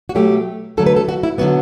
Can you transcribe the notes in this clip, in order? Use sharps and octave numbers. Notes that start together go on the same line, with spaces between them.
F#4
B2 F#3 A3 G4
D3 F#3 A3 A4
B4
A4
F#4
E4
D3 F#3 B3 F#4